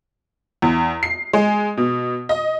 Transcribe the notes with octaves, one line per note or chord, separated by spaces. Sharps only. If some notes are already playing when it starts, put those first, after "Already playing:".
E2
C7
G#3
B2
D#5